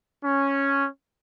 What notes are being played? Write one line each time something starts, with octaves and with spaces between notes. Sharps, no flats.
C#4